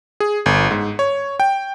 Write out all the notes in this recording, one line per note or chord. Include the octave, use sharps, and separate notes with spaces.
G#4
G1
G#2
C#5
G5